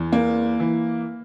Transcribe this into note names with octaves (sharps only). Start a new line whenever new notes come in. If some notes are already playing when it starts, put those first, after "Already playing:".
Already playing: E2
A#3
E3